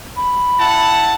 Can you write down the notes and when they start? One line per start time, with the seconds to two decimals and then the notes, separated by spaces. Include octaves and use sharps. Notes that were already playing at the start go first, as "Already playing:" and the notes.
0.17 B5
0.59 E4 F#5 A5